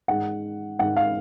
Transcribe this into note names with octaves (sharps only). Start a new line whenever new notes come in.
G#2 G#3 F#5
G#2 G#3 F#5
F5